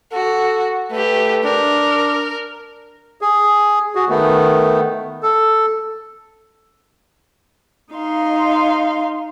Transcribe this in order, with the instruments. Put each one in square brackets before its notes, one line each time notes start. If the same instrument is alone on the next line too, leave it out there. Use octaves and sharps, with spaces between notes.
[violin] F#4 [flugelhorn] A4
[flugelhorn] A3 [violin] G4 B4
[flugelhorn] D4 [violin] A#4
[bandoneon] G#4
F#4 G#4
D#3 A3 B3
A4
[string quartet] D#4 F5 C6